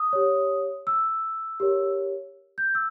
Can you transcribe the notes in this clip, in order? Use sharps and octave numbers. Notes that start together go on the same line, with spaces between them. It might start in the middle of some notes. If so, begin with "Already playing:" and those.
Already playing: D#6
G4 C#5
E6
G4 A#4 C#5
G6
E6